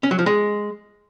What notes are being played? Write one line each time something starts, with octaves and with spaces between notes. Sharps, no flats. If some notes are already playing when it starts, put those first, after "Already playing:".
C#4
F#3
F3
G#3